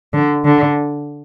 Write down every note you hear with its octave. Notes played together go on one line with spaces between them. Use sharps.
D3
D3